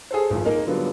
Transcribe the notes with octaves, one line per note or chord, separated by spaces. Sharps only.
G#4 A4 C5
G#1 D#2 F3
A#3 D#4 A#4
D3 F#3 G3 B3 F4